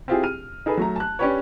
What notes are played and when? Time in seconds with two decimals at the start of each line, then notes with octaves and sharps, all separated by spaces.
0.08 C4 E4 F4 G4 G#4
0.23 F6 D#7
0.66 D#4 G#4 A4 B4
0.77 F#3 A3 A#5
0.96 A5 F#6
1.19 C#4 D4 G4 B4 C#5